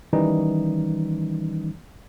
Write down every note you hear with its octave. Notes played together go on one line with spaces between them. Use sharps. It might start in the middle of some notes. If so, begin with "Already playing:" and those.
D#3 E3 G3 C#4 D#4